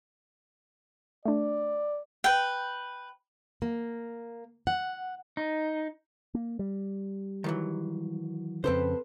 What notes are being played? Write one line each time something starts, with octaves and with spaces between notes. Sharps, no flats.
A3 D4 D5
B4 G5
A#3
F#5
D#4
A#3
G3
D#3 E3 F#3
F2 C#3 C4 A4 B4 C5